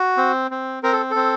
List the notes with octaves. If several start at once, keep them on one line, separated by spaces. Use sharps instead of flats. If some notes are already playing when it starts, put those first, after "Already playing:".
Already playing: F#4
C4
C4
C4 A#4
A4
C4 A4